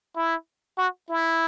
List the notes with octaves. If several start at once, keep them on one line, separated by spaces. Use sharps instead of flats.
E4
F#4
E4